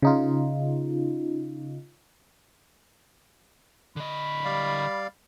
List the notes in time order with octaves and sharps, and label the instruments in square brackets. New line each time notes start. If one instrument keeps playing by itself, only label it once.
[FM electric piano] C#3 D#4 F4
[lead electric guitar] D3 D#5 [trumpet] B5
[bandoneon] G3 D5 F5